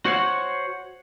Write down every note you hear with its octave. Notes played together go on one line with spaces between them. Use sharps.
F#4 C5 C#5 F5 F#5